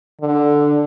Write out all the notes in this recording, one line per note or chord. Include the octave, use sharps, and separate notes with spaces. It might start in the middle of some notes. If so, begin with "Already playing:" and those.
D3